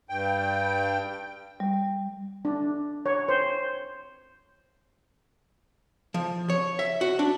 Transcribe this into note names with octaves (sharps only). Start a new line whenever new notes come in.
G2 G5
G3
D4
C#5
C5
F3
C#5
E5
F#4
D4